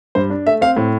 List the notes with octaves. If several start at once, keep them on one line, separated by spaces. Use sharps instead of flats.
G2 C5
D4
A3 E5
C4 F5
A2